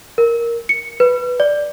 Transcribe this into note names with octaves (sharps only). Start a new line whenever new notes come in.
A#4
C#7
B4
D5